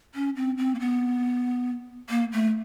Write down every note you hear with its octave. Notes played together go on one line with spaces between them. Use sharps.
C#4
C4
C4
A#3
B3
A#3
A3